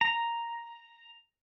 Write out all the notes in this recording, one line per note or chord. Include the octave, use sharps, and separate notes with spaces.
A#5